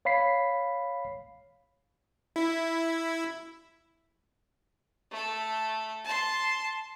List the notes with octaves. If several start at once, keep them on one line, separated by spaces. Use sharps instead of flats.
C#5 F5 B5 B6 C7
E4
A3 A4
A5 C6